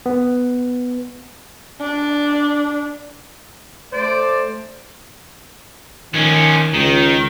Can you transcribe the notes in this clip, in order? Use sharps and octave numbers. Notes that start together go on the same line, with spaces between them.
B3
D4
A3 C5 D5
D#3 F3 C#4
C#2 D#3